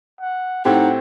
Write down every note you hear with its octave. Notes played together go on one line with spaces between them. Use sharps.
F#5
A2 C4 D#4 G4 F#5